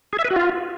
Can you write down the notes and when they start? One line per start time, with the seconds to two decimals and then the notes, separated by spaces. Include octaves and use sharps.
0.13 G#4
0.19 E5
0.24 B4
0.30 F#4
0.36 F4